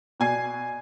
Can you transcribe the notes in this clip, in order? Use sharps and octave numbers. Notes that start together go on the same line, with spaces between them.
B2 D5 G#5 G#6 C7